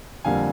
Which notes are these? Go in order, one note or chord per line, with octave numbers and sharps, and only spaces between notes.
F2 D3 G3 A#3 F5 G#5